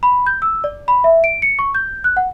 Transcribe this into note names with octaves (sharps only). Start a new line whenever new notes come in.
B5
G6
E6
D5
B5
E5
D7
C#7
C#6
G6
F#6
F#5